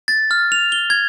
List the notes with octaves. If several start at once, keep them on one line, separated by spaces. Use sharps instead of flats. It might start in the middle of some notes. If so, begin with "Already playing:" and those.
A6
F6
F7
G7
G#6